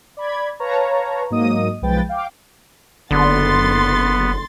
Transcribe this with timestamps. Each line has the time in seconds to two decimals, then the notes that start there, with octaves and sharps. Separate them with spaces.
0.17 D5 B5 G#6
0.59 B4 C#5 F5 A5 A#5
1.30 G#2 F#3 A#3 D#5 D#6 D#7
1.81 B1 F3 G#3 B4 G5 A6
2.09 F5 G5 D6
3.11 F#1 D3 B3 C6 A6